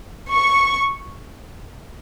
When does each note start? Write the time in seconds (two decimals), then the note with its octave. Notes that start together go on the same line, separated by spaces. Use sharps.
0.31 C#6